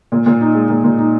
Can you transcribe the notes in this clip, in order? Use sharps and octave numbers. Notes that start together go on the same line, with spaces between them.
A#2
A#2
D#4
G#3
A#2
A#2
D#4